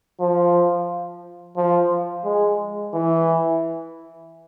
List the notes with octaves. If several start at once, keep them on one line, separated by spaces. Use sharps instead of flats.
F3
F3
G#3
E3